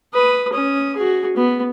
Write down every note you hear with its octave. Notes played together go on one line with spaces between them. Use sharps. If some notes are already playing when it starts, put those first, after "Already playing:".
B4 D#6
C#4 D#6
F#4 G#4
B3